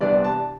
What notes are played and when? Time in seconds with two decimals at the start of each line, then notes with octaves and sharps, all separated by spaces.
0.01 C2 C3 E3 B3 D4 D5
0.24 A5